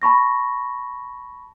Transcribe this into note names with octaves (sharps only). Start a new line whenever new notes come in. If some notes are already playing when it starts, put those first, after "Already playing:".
A5 B5 C#6 A#6